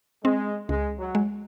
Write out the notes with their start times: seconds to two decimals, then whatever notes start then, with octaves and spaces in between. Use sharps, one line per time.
0.24 G#3 C4
0.69 C#2 G#3
0.99 F#3
1.15 G#3